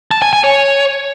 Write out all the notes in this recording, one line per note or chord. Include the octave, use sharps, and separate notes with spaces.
A5
G#5
G#5
C#5